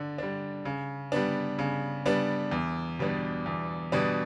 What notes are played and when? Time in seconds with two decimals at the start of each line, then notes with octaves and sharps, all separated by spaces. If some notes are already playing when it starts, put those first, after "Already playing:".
Already playing: D3 D4
0.18 G3 D4
0.65 C#3
1.12 G3 B3 D4
1.59 C#3
2.06 G3 B3 D4
2.51 E2
2.99 B2 G3 B3 D4
3.46 E2
3.92 B2 G3 B3 D4